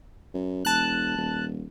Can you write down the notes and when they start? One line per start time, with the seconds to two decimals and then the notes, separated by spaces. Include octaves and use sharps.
0.34 F#2
0.65 E1 A5 F#6
1.18 D#1